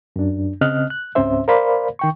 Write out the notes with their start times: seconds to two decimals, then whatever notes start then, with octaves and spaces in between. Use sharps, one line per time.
0.16 F#2 D4
0.61 C#3 C4 D#5 F6 F#6
0.90 F#6
1.15 C#2 G#2 C4 C#4 C5 E5
1.48 A#4 C5 D5 F5 B5
1.99 D#3 G5 C#6